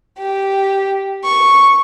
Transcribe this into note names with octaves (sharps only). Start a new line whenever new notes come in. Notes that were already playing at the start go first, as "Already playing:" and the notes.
G4
C#6